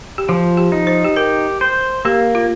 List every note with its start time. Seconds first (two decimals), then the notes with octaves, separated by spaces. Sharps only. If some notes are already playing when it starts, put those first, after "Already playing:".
0.18 G4
0.29 F3 F4
0.57 G4
0.72 D#4
0.87 C5
1.04 G4
1.16 G4 A#4
1.61 C5
2.05 A#3 G4
2.35 F4